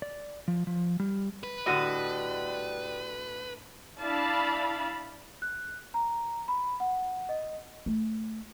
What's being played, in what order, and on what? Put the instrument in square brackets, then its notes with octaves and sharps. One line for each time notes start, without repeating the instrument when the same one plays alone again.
[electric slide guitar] D5
F3
F3
G3
[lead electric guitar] B4
[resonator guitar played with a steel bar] A2 D3 [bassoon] G3 [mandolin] F#4 D#5
[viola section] D4 E4 D5 F5 A5 B5
[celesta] F#6
A#5
B5
F#5
D#5
[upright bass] A3